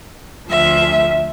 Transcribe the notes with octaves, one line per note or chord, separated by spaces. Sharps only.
D2 F3 E5